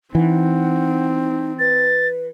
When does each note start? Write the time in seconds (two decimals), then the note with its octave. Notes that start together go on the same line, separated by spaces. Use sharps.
0.15 E3 C4 D#4 F#5
1.59 B4 A6